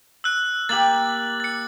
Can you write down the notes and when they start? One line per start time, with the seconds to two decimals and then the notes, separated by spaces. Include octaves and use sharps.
0.24 E6 F#6
0.69 A#3 G4 A6 F#7
1.40 A6 C#7